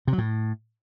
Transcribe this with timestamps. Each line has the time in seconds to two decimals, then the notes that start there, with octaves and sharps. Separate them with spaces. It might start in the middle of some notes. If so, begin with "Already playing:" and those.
0.08 C3
0.13 F#3
0.18 A2